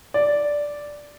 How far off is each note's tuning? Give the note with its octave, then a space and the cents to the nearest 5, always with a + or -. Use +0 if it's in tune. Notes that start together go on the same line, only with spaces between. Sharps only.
D5 -5